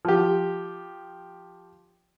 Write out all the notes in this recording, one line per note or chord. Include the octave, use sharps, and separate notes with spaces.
F3 G4